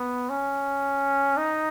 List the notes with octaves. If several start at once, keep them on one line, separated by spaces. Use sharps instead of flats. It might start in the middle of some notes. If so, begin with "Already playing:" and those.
Already playing: B3
C#4
D#4